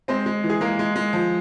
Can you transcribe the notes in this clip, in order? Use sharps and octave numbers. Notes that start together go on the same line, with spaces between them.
G#3 C4 C5
G#3
E3
G#4
G#3 A#3 A#4
G#3
G#3
F3